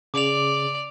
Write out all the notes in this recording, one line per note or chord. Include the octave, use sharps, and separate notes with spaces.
C#3 D5 D6 F7